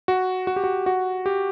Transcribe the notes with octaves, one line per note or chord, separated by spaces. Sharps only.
F#4
F#4
G4
F#4
F#4
G4